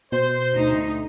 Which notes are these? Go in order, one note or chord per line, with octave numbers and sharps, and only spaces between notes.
B2 C5
D2 D#4